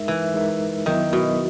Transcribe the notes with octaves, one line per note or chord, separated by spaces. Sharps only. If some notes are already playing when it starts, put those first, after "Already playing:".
Already playing: G#3 D#4 A#4 E5
E3
G#3 D#4 A#4 E5
D#3 F#3 B3 E4 A#4 E5
B2